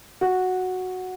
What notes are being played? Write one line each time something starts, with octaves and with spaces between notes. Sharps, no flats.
F#4